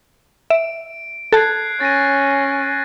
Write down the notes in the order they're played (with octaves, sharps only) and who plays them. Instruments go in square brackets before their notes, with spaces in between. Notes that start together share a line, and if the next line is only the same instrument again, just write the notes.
[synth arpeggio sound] E5 [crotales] D7
[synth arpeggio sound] A4 A5 [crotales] F#6 G#6 C7
[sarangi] C#4 [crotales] A6 A#6 D#7